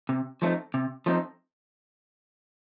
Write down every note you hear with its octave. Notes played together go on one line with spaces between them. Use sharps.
C3
F3 A3 C4 D#4
C3
F3 A3 C4 D#4